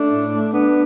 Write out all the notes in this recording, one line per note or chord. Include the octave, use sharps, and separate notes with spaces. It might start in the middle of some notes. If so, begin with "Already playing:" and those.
Already playing: A3 D4
A2
A3
B3 D4